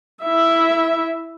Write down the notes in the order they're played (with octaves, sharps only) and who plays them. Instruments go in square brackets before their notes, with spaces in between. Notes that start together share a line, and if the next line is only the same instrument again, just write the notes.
[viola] E4 E5